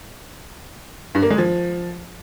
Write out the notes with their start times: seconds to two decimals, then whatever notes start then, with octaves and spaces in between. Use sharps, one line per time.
1.15 G2
1.23 A#3
1.30 G#3
1.38 F3